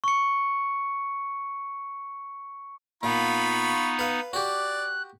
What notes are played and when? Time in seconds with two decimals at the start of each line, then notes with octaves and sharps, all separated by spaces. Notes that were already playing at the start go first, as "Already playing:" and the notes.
0.04 C#6 C#7
3.03 A#2 B3 D#4 F4 B5 C#6
3.99 B4 F5
4.33 F#4 G4 D5 F#6